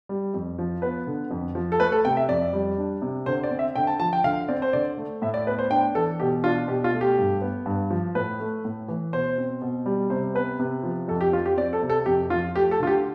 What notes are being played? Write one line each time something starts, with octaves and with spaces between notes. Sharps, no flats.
G3
F2
F3
B3 B4
D3
F2
F3
A4
A3 B4
A4
C3 G5
E5
F2 D5
G3
D4
C3
D3 C5
D5
C4
E5
D3 G5
A5
F3 A5
G5
D3 F5
C4 D5
C5
D3 D5
A3
A2 E5
D5
B3 B4
C5
D4 G5
E3 A4
B2 G4
D4 F4
B2 G4
F4
A3
G4
G2
B3
G2
F3
A2 B4
A3
A2
E3
B2 C5
C4
B2
G3
C3 C5
B3 B4
C3
F3
F2 A4
G4
F3 F4
G4
C4 D5
A4
C3
A4
F2 G4
F3 F4
A3 G4
A4
D3 F4
G4